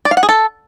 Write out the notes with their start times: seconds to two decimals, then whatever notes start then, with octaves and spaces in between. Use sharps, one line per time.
0.05 D5
0.11 F5
0.17 F#5
0.23 G#4
0.29 A4